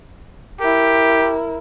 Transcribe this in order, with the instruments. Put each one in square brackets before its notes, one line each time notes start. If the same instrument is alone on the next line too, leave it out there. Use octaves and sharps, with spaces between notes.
[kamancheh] E4 A#4 [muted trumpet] G4